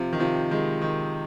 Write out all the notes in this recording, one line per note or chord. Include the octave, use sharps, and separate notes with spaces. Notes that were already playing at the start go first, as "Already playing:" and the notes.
Already playing: C3 F3
D#3
C3 F3
D#3 G#3
D#3